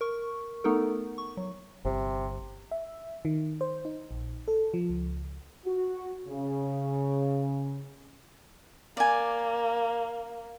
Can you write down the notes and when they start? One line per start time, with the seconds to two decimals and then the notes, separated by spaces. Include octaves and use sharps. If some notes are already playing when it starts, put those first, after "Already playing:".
0.01 A#4 C#6
0.64 A3 B3 D#4 A4 A#4
1.18 C#6
1.37 F#3
1.85 G1 C3
2.71 E5
3.25 D#3
3.61 C5
3.85 D#4
4.11 A#1
4.48 A4
4.74 F3
4.90 C#2
5.66 F#4
6.28 C#3
8.97 A#3 D5 G#5